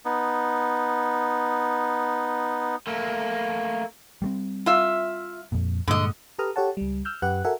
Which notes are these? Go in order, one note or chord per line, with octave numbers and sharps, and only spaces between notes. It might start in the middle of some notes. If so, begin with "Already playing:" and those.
B3 D#4
A3 A#3
G3 A3 C4
F4 E5
F2 A#2
G2 A#2 D3 G#3 D#5
G4 A4 B4 A#5 D#6 F6
G4 A4 C#5 F#5 A5
C#2 G3
E6 F6 G6
F#2 G4 B4 F#5 F#6
F#4 A4 A#4 E5 F#5 G#5